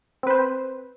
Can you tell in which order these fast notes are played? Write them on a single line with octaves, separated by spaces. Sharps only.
C4 B4 C5